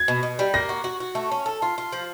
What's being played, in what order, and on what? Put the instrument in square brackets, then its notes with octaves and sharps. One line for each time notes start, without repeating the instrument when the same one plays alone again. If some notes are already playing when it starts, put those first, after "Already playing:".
Already playing: [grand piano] G#6
[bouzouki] B2
B2
G3
[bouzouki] A#3 [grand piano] A#6
[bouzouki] F#4
F#4
F#4
A3
C#4
A4
F4
F4
F3